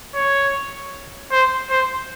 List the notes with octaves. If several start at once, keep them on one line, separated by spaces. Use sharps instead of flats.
C#5
C5
C5